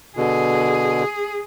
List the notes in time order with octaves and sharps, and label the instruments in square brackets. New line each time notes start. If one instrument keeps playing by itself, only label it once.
[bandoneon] B2 D3 [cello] G#4